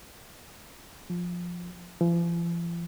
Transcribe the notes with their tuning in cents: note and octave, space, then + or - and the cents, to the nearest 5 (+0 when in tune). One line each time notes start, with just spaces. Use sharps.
F3 +10
F3 -45